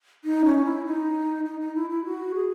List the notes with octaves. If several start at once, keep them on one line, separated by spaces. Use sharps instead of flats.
D#4
C#4
E4
D#4
D#4
D#4
E4
E4
F#4
G#4